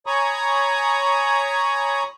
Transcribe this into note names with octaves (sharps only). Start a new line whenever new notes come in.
C#5 G#5 A#5 B5 C#6 D#6